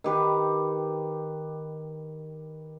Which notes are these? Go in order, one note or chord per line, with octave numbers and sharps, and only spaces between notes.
D#3 G4 B4